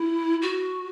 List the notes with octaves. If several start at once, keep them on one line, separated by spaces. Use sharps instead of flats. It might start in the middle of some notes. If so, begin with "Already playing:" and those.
Already playing: E4
F#4